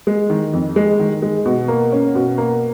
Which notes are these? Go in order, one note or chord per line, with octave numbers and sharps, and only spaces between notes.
G#3
D#3
F2
G#3
D#3
G#3
B2
A#3
C#4
B2
A#3